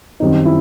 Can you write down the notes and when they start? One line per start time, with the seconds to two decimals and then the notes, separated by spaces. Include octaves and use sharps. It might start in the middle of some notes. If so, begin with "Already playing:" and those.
0.20 F#2 D#3 G3 C4 D#4
0.45 E4